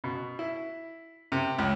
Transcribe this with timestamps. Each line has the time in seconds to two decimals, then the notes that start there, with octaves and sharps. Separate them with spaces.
0.04 B2
0.39 E4
1.32 C3
1.58 C#2